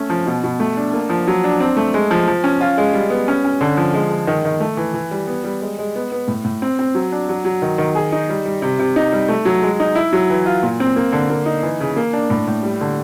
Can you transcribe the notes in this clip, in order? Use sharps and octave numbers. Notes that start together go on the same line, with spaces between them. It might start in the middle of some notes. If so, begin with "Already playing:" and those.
Already playing: A3 C#4
F3
B2
B2
A3
D4
A#3
F3
F#3
D4
C4
A3
G#3
F3
F3
C#4
F4
G#3
G3
B3
C#4
C#4
D3
F3
G#3
G#3
D#3
D#3
A3
E3
E3
G3
B3
G3
G#3
G#3
B3
B3
A2
A2
C4
C4
F#3
D4
F#3
F#3
D#3
D#3
G#4
D#4
G3
G3
C3
C3
D#4
G3
A3
F#3
G#3
D#4
E4
F#3
E3
F4
A#2
C4
A#3
D3
A#3
D#4
E3
C#3
A#3
D4
A2
A2
G3
D3